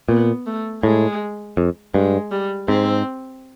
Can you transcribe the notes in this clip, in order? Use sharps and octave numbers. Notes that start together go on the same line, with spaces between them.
A#2 B3
A3
A2 G#3
F2
G2 G#3
G3
G#2 C4